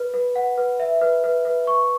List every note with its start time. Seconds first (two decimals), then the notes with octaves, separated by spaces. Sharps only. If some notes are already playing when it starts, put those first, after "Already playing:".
Already playing: B4
0.14 B4
0.35 F#5
0.58 B4
0.80 E5
1.01 B4
1.24 B4
1.45 B4
1.67 C#6